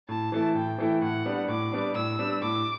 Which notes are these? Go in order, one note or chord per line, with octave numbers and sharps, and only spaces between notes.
A2 A5
E3 A3 E4
A2 G5
E3 A3 E4
A2 F#5
G3 B3 D4
A2 D6
G3 B3 D4
A2 E6
G3 B3 D4
A2 D6